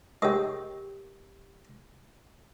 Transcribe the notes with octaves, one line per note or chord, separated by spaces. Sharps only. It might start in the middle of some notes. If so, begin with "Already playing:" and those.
G#3 G4 A#4 G5 D#6